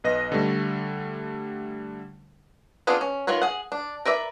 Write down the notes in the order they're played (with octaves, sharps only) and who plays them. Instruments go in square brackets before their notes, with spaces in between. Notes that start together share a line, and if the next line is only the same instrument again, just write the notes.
[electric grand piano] B1 B4 D#5 A#6
D3 G3 A3
[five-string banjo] B3 C4 D4 F4 G#4
C#4
D#3 F4 B4 C#5
G#4 F#5
D4
A#4 B4 D5 E5